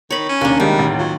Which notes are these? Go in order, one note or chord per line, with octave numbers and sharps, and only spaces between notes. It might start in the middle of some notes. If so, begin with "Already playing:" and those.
D#3 C#5 B5
C#4
D#2 C#3 A#3 D4
C2 D#3 G3 G#3
A1 D2
F#3 F4